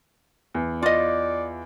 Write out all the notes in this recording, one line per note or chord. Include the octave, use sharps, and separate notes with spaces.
E2
F4 D5 D#5